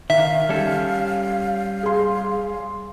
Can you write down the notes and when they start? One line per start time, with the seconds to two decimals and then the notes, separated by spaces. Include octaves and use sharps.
0.10 D#3 E5 F5
0.49 G3 C#4 A4
1.83 G#4 C6